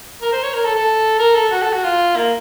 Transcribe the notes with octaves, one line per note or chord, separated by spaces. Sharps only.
A#4
C5
C#5
A#4
A4
A4
A#4
A4
F#4
A4
F#4
F4
A#3